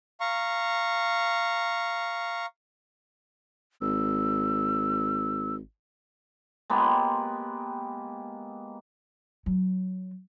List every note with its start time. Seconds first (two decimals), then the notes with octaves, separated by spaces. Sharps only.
0.20 F5 A#5 C#6
3.81 G#1 E6
6.70 G#3 A#3 B3 G4
9.46 F#3